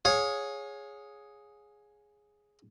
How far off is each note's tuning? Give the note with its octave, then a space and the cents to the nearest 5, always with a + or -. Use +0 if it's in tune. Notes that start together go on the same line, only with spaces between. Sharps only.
G#4 +0 C#5 +0 F5 +35